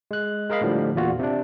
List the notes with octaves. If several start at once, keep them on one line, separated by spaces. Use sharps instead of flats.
G#3 F#6
G#3 A#4 D#5 F5 B5
A2 D3 F3 G3
E2 A#2 F4 F#4
C3 D4